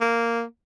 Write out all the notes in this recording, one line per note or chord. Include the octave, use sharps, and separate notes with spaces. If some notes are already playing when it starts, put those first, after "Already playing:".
A#3